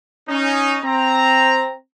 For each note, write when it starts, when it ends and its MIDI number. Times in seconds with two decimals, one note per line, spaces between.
0.29 0.78 61
0.29 0.78 63
0.84 1.73 60
0.84 1.73 82